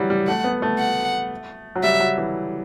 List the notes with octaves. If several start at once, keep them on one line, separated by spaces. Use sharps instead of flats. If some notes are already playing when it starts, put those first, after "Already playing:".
Already playing: E3 F#3 G3
G3
A3 F#5
B3
A3
F#5
F#3
G3 E5
F#3
E3